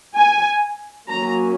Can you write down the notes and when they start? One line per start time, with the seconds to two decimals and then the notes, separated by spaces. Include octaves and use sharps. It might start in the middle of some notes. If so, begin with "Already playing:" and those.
0.16 G#5
1.08 F#3 A#3 C#4 A#5